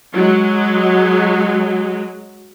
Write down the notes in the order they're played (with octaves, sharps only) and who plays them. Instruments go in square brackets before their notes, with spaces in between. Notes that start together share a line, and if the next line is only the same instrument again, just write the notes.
[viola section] F#3 G#3